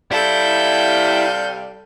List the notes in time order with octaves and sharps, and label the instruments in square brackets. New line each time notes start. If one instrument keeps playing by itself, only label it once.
[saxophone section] C3 F5 [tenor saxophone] G3 [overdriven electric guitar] E4 [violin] A4 G6